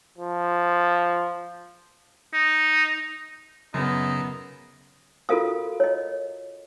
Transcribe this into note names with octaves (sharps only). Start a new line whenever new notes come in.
F3
D#4
F#2 C#3 B3 D#4
F4 F#4 A4 A#4 F5 D#6
C#5 D#5